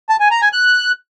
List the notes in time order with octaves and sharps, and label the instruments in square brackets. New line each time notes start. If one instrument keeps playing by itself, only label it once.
[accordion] A5
G#5
A#5
G#5
F#6